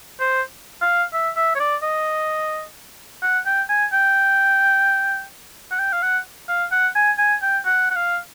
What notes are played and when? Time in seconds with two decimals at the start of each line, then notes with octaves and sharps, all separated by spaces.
0.20 C5
0.82 F5
1.13 E5
1.36 E5
1.55 C#5
1.60 D5
1.82 D#5
3.23 F#5
3.46 G5
3.69 G#5
3.93 G5
5.71 F#5
5.79 G5
5.92 F5
6.02 F#5
6.48 F5
6.72 F#5
6.95 G#5
7.18 G#5
7.42 G5
7.65 F#5
7.90 F#5
7.96 F5